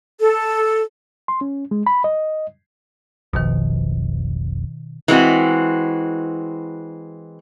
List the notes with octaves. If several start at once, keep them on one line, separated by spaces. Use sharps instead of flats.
A4
C6
C#4
G#3
B5
D#5
F1 B1 F2 B2 D#3
E3 G#3 C4 F#4